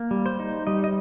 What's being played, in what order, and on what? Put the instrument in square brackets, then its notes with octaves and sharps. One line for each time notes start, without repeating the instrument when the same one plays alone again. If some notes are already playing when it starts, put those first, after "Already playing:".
Already playing: [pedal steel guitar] A#3
G3
C5
D#4
G3 D#5
D#5